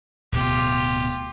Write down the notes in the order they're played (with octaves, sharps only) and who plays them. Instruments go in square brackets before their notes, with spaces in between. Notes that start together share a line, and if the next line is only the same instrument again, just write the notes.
[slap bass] D1 B2 A3 [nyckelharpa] F4 G4